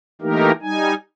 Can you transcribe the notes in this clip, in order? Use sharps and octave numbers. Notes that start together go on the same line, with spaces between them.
E3 A3 A#3 D#4 G4 A#4
G3 D#4 G#5